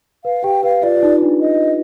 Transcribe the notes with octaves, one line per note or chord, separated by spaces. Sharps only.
B4 F5
G4 G5
B4 F5
F4 D5
F4
D#4
D4
D#5